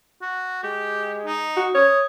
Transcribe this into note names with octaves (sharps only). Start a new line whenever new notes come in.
F#4
G#3 G4
D#4
F#4
C#5 D#6